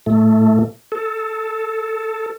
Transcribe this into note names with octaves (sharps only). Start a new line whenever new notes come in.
A2 A3
A4